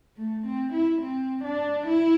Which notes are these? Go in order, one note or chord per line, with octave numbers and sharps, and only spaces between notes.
A3
C4
E4
C4
D4
E4